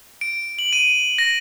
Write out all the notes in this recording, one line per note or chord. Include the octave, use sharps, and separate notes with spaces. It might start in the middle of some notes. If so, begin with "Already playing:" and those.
D7
F#7
D#7
A#6